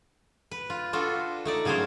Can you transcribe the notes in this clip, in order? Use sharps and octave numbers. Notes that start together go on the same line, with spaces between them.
B4
F4
D4 F4 F#4 A4
A3 D#4 D5
C#3 F#3 G#4 A#4 C5